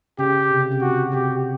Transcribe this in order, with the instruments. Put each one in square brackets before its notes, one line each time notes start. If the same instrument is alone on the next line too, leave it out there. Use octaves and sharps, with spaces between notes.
[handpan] C#3 [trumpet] G4
[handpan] C3
C#3
C3
[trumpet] F#4
[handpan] C3 [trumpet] G4